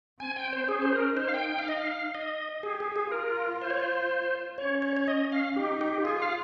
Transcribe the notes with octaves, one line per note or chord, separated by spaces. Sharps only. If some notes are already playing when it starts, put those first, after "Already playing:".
C4 G#5
G5
C5
C#4 G#4
C5
A#4
D#4 C5
F5
G5
G5
F5
D#5
F5
D#5
G4 G#4
G#4
G#4
F4 A#4
C5
C#5
C5
C#4 C#5
C#5
C#5
D#5
F5
D#4 G4
G4
F4 G#4
F5